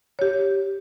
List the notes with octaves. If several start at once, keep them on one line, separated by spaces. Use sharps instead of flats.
G4 C#5